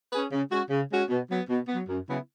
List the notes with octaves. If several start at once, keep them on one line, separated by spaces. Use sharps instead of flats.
C#4 G#4 B4
C#3
G#3 C#4 F#4
C#3
G#3 C#4 F#4
B2
F#3 B3
B2
F#3 B3
F#2
C#3 F#3 B3 E4